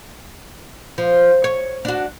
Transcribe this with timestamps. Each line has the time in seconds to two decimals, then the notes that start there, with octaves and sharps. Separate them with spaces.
0.98 F3
1.44 C#5
1.85 D4 F#4